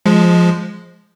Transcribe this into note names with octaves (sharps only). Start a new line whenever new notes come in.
F3 G#3